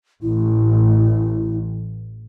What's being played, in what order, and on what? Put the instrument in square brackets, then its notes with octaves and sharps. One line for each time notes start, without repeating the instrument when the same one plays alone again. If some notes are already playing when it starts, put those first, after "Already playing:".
[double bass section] A1 [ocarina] E4